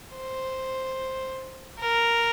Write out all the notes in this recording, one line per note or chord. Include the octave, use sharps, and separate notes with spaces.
C5
A#4